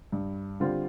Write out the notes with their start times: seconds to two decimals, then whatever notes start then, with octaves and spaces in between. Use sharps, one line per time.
0.12 G2
0.60 D3 G3 C4 F4